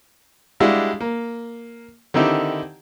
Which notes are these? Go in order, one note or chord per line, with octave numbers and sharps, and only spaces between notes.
G3 G#3 D4 E4 F#4 F5
A#3
D3 D#3 C4 D#4 E4 G4